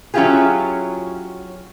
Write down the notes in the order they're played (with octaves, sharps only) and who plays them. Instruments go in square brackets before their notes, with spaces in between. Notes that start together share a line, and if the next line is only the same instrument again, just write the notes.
[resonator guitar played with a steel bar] F#3 C#4 E4 F4 G4 G#4